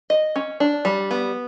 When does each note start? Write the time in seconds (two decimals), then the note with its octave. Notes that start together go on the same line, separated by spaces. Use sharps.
0.10 D#5
0.36 C#4
0.60 D4
0.85 G3
1.11 B3